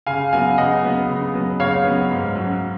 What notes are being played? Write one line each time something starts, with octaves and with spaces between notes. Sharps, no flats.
C#3 F5 G#5
F#3 B3 F5 G#5
C#3 D#5 F#5
F#3 B3
C#3
F#3 B3
C#3 C#5 F5
F#3 B3
G#2
F#3 C#4